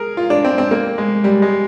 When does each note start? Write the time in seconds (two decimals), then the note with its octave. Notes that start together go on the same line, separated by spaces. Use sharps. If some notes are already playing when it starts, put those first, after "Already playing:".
Already playing: G#4 A#4
0.17 F4
0.30 D4
0.44 C4
0.58 C4
0.71 A#3
0.98 G#3
1.24 G3
1.42 G#3